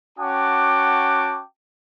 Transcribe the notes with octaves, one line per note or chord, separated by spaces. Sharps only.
C#4 F#4 F#5 G5 A5 D6